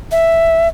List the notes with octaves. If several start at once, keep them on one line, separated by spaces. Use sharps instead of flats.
E5